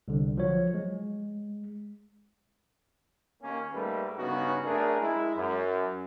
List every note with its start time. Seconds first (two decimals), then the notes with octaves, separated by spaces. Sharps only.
0.08 C2 D3
0.37 F3 F#3 C#5
0.74 G#3
3.43 D#2 A#3 C#4
3.74 G#2 G3 A3 A#3 A#4 B4
4.18 G2 C#3 B3 C#4 D#4 F#4
4.65 F#2 A3 D4 G#4 A#4
5.02 G#3 E4
5.36 F#2